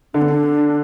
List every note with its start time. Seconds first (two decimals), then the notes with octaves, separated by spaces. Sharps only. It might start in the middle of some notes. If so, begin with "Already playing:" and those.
0.14 D3 D4
0.21 B3
0.29 D4